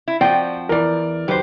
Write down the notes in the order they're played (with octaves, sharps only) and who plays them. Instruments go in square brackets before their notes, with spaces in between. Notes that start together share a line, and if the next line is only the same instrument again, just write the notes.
[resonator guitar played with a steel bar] E4
[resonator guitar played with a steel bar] F3 G5 [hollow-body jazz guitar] C4 F4 F#4 [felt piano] D5
[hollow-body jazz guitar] E2 E3 [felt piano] A#4 D5
[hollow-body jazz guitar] F#2 D#3 B4 [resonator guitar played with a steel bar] G4 C5